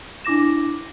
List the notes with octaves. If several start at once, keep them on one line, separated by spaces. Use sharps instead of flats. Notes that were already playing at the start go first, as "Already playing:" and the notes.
D4 E4 D6 A#6 E7